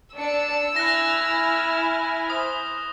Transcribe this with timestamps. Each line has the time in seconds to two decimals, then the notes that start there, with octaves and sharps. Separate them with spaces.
0.16 D4 D5 E6 C#7
0.76 E4 G#5 F6 F#6 A#6
2.30 C5 D#6